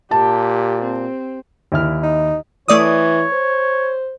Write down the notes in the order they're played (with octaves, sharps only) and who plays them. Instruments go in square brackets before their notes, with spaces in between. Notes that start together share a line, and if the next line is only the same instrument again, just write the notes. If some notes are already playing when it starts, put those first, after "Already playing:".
[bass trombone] A#2 [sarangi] G4 [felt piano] A5
[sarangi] C4
[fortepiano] D#2 E4 F6
[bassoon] D#4
[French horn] E3 [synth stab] A3 D5 D#6 [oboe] C#5
[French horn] C5